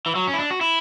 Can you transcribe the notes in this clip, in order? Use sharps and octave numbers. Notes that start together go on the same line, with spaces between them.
E3
F#3
C#4
E4
D4
F#4
E4